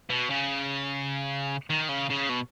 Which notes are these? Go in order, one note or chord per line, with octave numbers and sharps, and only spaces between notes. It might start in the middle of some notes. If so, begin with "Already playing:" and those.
B2
C#3
D#3
C#3
C#3
B2